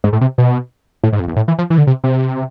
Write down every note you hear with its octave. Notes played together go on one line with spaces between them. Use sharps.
G#2
A2
C3
B2
A2
G#2
F2
E2
A2
E3
F3
E3
D3
C3
C3